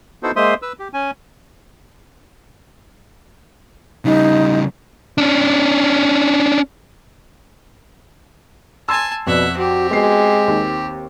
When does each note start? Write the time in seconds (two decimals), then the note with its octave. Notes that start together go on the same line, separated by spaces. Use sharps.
0.23 B3 D#4 E4 F#4 A4 C5
0.36 G#3 A#3 C5 E5 C6 D#6
0.62 B4 E6
0.79 G4
0.93 C#4 G#5
4.05 C#3 G3 D#4
5.18 C#4 D4
8.89 G#5 A5 C6 E6
9.27 F2 B2 D5 E5 F#5
9.58 C4 F#4 G4
9.91 G#3 B3 F#4 C7
10.48 D#2